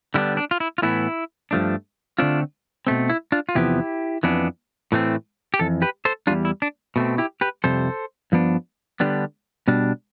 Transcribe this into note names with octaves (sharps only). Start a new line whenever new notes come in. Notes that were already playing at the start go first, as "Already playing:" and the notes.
D3 G3 B3 D4 E4
D4
F4
E4
F4
A2 E3 B3 E4
G2 F3 A3 D4
D3 A3 C4 D4 F4
B2 A3 C4
E4
D4 F4
F4
E2 C3 F3 B3 E4 G4
F2 E3 B3 D4
A2 E3 A3 C4
G4
F2 E3 A4
G4 B4
A4 C5
E2 B2 G3 D4 F4
E4
D4
B2 A3 C4
E4 G4
G4 B4
F2 C3 G3 A4 C5
G2 F3 B3 D4
D3 G3 B3 D4
B2 G3 D4